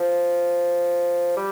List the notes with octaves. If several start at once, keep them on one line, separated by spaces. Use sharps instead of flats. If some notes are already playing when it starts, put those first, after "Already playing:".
Already playing: F3
G3